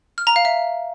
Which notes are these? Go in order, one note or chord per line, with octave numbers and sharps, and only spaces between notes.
F6
A#5
F5
E5